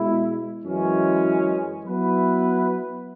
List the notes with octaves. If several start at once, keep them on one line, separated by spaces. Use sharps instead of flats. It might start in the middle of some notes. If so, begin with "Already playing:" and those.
Already playing: B2 G#3 E4
F#2 E3 G#3 C#4
F#3 B3 E4 B4